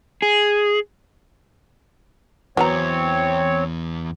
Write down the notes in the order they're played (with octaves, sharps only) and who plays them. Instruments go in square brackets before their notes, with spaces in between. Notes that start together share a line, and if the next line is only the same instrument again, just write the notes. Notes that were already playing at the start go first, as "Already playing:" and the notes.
[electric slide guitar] G#4
[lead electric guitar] E2 [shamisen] F#3 B3 A#5 [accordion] C4 C#5